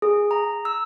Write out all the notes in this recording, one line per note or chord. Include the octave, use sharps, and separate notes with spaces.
G#4
A#5
E6